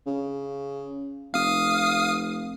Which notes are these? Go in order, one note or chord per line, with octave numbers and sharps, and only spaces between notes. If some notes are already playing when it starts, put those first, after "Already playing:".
C#3
F1 F5 D#6